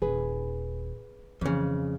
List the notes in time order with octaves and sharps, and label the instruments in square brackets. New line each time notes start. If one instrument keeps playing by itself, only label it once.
[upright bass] D#1 D#2 [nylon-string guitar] G#4 B4
[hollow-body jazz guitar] F2 C#3 [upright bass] E3